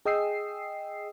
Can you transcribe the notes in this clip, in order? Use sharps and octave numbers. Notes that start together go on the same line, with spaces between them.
G#4 D#5 G5 D#6 E6 C7